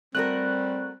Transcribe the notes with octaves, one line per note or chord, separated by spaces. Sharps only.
G3 A3 C4 F#4 A#4 F#6